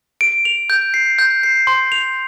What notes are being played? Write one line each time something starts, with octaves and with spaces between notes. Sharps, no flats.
D7
F7
G6
C7
G6
C7
C6
F7